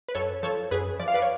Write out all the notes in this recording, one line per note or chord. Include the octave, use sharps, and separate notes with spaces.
B4
F#2 A4 C#5
F3 A4 C#5
F#2 G#4 B4
F3 D5
F5
B4 D5
C#5